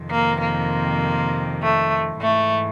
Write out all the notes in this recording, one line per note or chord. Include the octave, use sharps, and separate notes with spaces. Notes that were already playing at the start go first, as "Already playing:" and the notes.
Already playing: F2 C3 D#3
A#3
A#3
A3
G#2 E3 A3